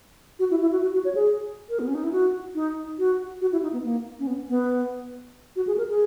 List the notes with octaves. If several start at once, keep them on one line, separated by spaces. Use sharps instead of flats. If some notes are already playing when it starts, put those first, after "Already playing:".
F#4
E4
E4
F#4
F#4
F#4
C#5
G#4
A#4
B3
C#4
D#4
E4
F#4
D#4
F#4
F#4
E4
D#4
B3
A#3
C#4
B3
B3
F#4
G#4
A#4
G#4